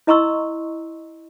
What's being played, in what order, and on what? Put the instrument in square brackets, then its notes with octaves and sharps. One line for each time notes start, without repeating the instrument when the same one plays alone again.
[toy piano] E4 D#5 A#5 C6 C#6 E6